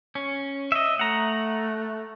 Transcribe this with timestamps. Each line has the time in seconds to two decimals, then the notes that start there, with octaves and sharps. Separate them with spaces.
0.15 C#4
0.72 D#5 E5
0.99 A3 F#5 A#5